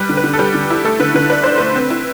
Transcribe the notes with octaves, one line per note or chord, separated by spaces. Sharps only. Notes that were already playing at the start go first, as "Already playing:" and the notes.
Already playing: G3 B4
D3
B4
D3
A4
G3 G4
D3
E4
A3 A4
D3 B4
D3 B4
D4 B4
D4 C5
A3 B4
C4
E4